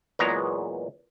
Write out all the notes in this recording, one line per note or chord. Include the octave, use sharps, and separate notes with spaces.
E2 A#2 F#3 G#3 B3 A#5